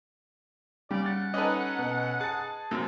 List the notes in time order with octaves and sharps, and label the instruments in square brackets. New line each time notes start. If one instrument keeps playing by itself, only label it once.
[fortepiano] C#3 [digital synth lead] G3 [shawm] D5
[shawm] F#5 [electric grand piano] A6
[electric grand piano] C#4 A4 [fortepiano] D#4 B4 D#5
[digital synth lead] B2
[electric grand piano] G#4 A6 [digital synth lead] A5
[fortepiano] F#2 C3